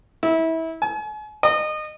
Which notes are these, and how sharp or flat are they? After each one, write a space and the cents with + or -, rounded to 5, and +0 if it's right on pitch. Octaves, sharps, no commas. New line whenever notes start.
E4 -25
G#5 +40
D#5 -25